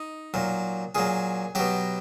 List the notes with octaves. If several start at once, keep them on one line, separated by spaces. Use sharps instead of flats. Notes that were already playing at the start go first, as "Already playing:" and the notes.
Already playing: D#4
A#2 F#3
A#2 F#3 G#4
B2 F#3 G4